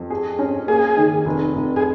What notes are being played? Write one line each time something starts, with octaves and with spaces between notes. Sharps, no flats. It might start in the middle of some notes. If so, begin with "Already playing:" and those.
Already playing: F2
G#4
C#4
A#3 G#4
D#3
F1
F1
G#4